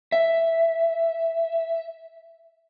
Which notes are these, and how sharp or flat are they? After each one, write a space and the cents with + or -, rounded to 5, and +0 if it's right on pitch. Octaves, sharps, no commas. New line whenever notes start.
E5 +5